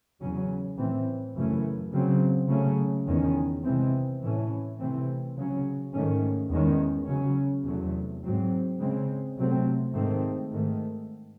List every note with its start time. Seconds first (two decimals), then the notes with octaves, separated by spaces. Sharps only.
0.21 E2 C#3 F#3 C#4
0.78 A2 E3 C4
1.36 F#2 C#3 E3 A3 C#4
1.93 C#3 F#3 C4
2.49 C#3 F#3 A3 C#4
3.07 E2 D#3 G#3 C#4
3.64 C3 E3 G#3 C4
4.22 A2 E3 A3 C#4
4.79 C3 E3 A3 C4
5.36 C#3 F#3 C#4
5.93 G#2 D#3 A3 C#4
6.50 E2 D#3 G#3 C#4
7.08 C#3 F#3 C#4
7.65 E2 C3 F#3 A3
8.23 G#2 F#3 C4
8.80 C#3 G#3 C4
9.37 C3 F#3 A3 C4
9.94 G#2 D#3 A3 C4
10.52 G#2 D#3 A3